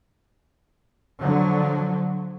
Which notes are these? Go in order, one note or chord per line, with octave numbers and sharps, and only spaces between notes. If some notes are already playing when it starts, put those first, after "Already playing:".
D3 F3 F#3